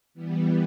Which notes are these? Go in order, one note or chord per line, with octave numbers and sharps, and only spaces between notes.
E3 G3 B3